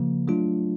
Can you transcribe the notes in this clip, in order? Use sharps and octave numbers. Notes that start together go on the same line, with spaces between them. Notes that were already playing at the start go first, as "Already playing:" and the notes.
Already playing: C#3 F3 A#3
F#3 A3 D4 F4